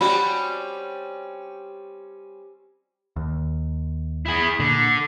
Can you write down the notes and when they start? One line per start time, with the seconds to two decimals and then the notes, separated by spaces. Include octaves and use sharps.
0.01 G3 C4 C#4 F#4 B5
3.16 D#2
4.26 E4 G#4
4.60 A#2 D3